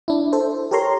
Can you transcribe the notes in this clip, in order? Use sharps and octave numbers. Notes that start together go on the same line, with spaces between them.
D4 E4
A4 C5
G4 A4 A#4 C#5 A#5 C6